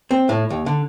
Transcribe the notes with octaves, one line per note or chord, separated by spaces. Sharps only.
C4
A2
D#2
D3